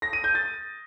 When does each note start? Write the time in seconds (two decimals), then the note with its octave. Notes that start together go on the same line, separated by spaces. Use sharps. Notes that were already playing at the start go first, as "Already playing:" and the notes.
0.02 A#6
0.13 D#7
0.24 G6
0.35 A6